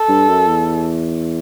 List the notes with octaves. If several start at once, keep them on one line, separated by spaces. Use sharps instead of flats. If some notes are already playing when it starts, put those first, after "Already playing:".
Already playing: A4
G2
F#2
E2